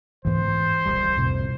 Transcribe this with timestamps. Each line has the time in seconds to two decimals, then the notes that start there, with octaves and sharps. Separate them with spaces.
0.25 D2 G#2 E3 B3 C5
0.86 D#1 C2 G3
1.17 F2 A2 C3